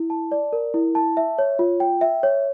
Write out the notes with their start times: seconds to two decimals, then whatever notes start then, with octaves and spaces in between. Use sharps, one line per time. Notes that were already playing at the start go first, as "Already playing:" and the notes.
Already playing: E4
0.10 A5
0.32 D5
0.53 A#4
0.74 E4
0.95 A5
1.17 E5
1.38 C#5
1.59 F4
1.80 G5
2.01 E5
2.23 C#5